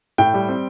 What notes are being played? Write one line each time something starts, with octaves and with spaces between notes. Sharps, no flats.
A2 G5
G3
C4